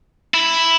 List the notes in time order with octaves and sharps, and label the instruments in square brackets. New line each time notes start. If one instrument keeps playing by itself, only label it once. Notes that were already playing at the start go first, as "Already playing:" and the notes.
[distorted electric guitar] E4